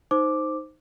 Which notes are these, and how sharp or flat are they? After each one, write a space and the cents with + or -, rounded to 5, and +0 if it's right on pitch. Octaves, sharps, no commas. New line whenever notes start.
D#4 +0 C5 +0 D6 +0